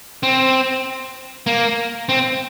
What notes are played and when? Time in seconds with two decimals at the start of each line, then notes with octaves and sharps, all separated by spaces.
0.23 C4
1.47 A#3
2.09 C4